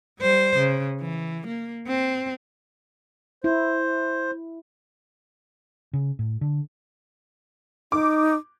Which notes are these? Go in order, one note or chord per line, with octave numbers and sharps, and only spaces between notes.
G3 C5
C#3
E3
A#3
C4
E4 C5
C#3
A2
D3
D#4 D6